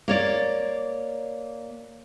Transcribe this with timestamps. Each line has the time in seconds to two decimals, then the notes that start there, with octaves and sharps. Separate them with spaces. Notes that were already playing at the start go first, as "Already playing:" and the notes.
0.08 A#3 C#5 D5